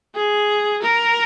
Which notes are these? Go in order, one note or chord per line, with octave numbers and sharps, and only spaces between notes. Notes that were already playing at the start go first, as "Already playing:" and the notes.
G#4
A#4